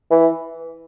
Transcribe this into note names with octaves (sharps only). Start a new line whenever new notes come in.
E3